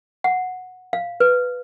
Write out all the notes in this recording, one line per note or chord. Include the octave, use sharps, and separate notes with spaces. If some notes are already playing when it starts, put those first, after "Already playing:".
F#5
F5
B4